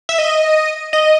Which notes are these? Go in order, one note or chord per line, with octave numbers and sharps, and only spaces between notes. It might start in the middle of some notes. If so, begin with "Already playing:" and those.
E5
D#5
D#5